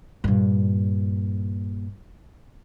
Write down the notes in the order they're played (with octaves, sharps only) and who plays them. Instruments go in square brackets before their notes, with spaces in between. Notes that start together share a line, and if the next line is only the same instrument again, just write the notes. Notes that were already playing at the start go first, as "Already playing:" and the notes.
[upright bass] G2 A#2